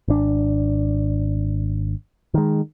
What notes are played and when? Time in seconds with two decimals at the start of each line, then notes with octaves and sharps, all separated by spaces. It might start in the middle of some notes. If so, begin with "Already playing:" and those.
0.08 G#1 D4
2.34 D#3 G#3